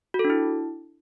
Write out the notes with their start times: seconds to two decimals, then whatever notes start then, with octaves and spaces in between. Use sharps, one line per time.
0.14 F#4
0.19 A4
0.25 D4
0.30 E4